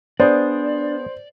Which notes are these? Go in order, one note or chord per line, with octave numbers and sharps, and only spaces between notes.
B3 D4 G#4 C5 D5